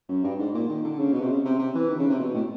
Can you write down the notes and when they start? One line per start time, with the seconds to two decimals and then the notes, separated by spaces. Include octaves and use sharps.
0.09 F#2
0.24 G2
0.39 G#2
0.55 A#2
0.69 D#3
0.84 D3
0.99 C#3
1.13 B2
1.21 C3
1.29 C#3
1.45 C3
1.59 C3
1.75 E3
1.89 D#3
1.99 C#3
2.10 C3
2.20 B2
2.35 A2